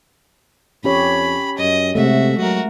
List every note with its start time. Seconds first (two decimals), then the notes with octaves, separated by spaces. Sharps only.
0.84 F2 C#4 G4 C#5 B5
1.58 F#2 D#5
1.95 C3 G#3 A3 F#4 E5
2.38 F#3 F#4 A#4